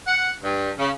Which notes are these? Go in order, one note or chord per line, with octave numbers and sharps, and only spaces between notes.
F#5
G2
C#3